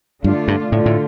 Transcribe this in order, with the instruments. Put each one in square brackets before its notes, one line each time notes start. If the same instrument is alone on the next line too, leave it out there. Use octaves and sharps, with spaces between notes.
[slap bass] G2 [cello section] D3 A3 D4 F4
[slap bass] G2
[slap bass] A2 [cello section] D3 A3 F4
[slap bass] A2